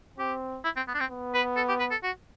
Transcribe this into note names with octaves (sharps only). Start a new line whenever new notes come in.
C4 G4
E4
C4
B3
D4
C4
B3
B4
A4
G4
B4
A4
F#4